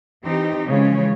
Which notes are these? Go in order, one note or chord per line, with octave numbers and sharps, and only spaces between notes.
E3 C4 D#4 G4
C#3 E3 F3 G#3 C#4 C#5